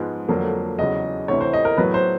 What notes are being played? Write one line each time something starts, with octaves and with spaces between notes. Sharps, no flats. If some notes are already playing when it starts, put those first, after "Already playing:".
Already playing: G#2 F3 G#3 B3
F2 D3 F#3 A#3
E2 C#3 F#3 D#5
D2 C3 E3 C#5
C5
D#5
A#4
A2 F#3 B3 B4
C5